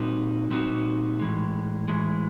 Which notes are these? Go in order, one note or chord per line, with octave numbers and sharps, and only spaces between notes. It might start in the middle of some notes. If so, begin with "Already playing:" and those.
Already playing: A#2 G3 C4 D#4 F#4
A#2 G3 C4 D#4 F#4
A2 E3 G#3
A2 E3 G#3